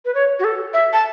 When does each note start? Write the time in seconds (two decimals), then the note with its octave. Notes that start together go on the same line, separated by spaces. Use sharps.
0.05 B4
0.15 C#5
0.40 F#4
0.44 A4
0.74 E5
0.93 A5